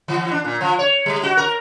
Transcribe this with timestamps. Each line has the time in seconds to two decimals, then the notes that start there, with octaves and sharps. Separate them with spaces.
0.08 E3
0.31 D4
0.44 A#2
0.61 F3
0.79 C#5
1.06 G3
1.23 F#4
1.37 A#4